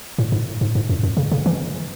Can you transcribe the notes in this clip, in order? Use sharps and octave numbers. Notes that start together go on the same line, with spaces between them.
A2
G#2
G#2
G#2
F#2
F#2
C#3
C#3
E3